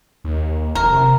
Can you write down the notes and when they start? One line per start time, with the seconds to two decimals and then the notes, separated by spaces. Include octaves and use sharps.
0.24 D#2
0.75 F1 A#4
0.92 C3